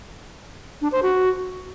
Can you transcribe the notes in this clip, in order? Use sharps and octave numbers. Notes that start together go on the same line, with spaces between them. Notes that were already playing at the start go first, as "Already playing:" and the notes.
D4
C5
F#4